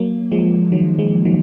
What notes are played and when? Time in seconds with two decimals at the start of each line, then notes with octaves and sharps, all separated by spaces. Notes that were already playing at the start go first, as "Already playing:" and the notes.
Already playing: F#3 A#3
0.31 F3 G#3
0.72 D#3 F#3
0.98 F3 G#3
1.25 D#3 F#3